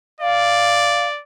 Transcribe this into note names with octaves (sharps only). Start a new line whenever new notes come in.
D5 F5